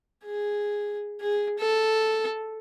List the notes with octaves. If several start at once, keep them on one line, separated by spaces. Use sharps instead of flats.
G#4
G#4
A4